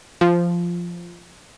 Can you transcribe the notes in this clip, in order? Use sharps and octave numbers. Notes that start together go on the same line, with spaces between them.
F3